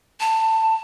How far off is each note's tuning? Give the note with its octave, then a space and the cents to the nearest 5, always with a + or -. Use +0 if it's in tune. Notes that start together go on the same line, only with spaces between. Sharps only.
A5 +15